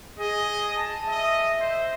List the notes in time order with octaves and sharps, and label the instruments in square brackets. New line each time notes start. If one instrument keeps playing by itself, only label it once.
[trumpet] G#4 [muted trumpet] D#5
[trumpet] A5
[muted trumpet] D#5 [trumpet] E5
[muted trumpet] C5